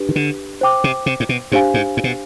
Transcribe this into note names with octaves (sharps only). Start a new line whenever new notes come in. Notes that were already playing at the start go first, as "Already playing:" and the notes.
Already playing: D4 G4 B4
D#3
D3
C5 G5 D6
C3
C3
G#2
B2
G#2 D4 G4 C5 F5 G#5
G#2
G#2
B2